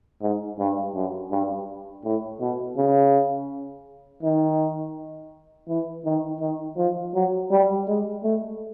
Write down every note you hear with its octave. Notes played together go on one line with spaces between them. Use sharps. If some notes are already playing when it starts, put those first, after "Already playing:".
G#2
G2
F#2
G2
A2
B2
C#3
D#3
E3
D#3
D#3
F3
F#3
G3
G#3
A3